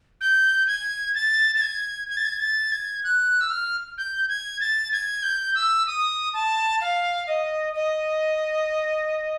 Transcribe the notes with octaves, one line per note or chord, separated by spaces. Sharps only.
G6
G#6
A6
A6
G#6
G#6
A6
G#6
A6
G#6
F#6
E6
F6
G6
G#6
A6
G#6
G6
E6
D#6
A5
F5
D#5
D#5